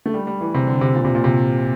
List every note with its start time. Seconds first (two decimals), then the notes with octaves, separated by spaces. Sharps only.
0.06 A3
0.14 G3
0.27 G3
0.41 E3
0.54 C3
0.67 D3
0.81 C3
0.95 A#2
1.05 C3
1.15 A#2
1.24 C3